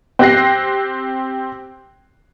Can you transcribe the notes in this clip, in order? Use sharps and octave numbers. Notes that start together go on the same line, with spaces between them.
C4 G4 F#6 A#6 C7